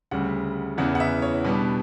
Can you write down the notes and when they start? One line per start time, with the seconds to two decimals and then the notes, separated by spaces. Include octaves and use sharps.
0.11 D2 C#3 G3 F#5
0.78 E2 C#3 E3 B3 F#5
0.95 F#5
1.00 E5
1.22 C#5
1.44 B2 G3 B3 D4 B4